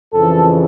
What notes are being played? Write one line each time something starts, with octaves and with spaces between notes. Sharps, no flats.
F2 C#3 E3 A4